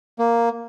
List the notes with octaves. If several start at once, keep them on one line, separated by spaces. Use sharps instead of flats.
A#3